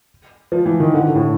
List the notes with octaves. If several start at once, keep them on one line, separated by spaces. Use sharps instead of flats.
F3
E3
D#3
D3
A2